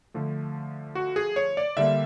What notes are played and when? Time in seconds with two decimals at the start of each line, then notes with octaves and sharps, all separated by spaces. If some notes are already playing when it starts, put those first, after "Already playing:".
0.14 D3 F3 A3
0.95 F#4
1.16 G#4
1.36 C#5
1.57 D5
1.77 D3 G3 A#3 E5